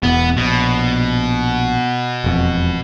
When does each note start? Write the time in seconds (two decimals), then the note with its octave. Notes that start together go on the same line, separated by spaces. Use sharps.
0.03 E1 E2 B3
0.37 A#1 B2
2.24 E1 F2